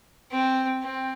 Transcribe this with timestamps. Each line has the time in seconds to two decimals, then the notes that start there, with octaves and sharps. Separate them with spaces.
0.31 C4
0.82 C4